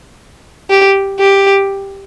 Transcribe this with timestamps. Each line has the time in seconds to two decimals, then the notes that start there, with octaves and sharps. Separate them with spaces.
0.70 G4
1.20 G4